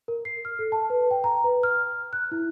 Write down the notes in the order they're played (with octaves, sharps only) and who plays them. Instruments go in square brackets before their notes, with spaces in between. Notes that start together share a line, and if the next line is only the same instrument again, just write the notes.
[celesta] A#4
C7
F6
A4
A5
B4
G5
A#5
B4
F6
F#6
E4